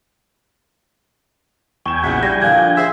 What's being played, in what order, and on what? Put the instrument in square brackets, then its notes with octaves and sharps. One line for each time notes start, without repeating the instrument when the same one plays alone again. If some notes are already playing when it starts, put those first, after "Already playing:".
[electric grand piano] E2 E7 [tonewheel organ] G5 G#5 [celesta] C#6
[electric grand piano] A#1 C#3 [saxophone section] E4 F#4 F#5 [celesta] B6
[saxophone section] G3 [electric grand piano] E4 [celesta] A#6
[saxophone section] A#2 D3 D4 [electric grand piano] F3 [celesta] F5 G#6
[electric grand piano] G#4 [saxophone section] C5 E5